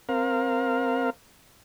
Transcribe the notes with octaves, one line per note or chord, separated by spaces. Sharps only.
C4 A#4 F5